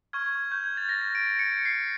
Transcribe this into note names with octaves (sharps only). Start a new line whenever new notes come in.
C#6 F6 G#6
G#6
G#6
G6
G#6
A6
A#6
A#6
D7
C#7
C7